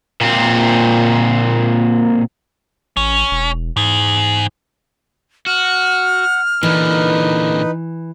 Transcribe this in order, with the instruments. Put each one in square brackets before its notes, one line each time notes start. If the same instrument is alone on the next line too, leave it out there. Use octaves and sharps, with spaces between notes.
[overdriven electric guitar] A#2 C4
[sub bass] A1 [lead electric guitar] C#4
[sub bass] E1
[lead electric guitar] E2 G#4 [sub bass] G#2
[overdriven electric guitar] F#4 [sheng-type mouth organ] F#5 [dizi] F6
[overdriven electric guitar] A#2 D3 [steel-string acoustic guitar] E3 [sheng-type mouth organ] D#4 B4